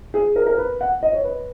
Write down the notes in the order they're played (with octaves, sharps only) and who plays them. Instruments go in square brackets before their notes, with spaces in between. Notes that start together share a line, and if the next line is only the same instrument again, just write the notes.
[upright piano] G#4
A#4
A#4
B4
F#5
D#5
C#5
B4